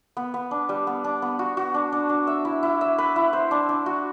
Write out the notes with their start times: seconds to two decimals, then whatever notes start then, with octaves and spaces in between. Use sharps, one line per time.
0.17 B3
0.34 B3
0.51 D4
0.69 G3
0.87 B3
1.04 D4
1.22 B3
1.39 F#4
1.57 F#4
1.74 D4
1.92 D4
2.09 D4
2.27 E5
2.45 E4
2.63 E4
2.81 E5
2.98 B4
3.16 E4
3.33 C5
3.51 D4
3.69 D4
3.86 F#4